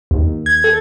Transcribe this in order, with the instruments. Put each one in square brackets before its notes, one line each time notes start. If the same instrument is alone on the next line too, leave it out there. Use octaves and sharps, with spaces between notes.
[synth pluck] D#2
G#6
A4